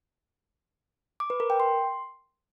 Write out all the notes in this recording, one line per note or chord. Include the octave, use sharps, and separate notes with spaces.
D6
B4
A#4
G5
C6